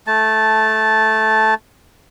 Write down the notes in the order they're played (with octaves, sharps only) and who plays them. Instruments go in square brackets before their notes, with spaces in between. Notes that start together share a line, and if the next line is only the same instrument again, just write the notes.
[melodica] A3 A5